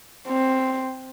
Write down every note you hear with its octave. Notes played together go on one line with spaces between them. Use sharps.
C4